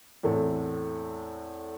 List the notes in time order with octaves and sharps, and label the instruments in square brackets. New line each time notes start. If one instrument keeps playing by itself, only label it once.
[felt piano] E2 A2 A3 C4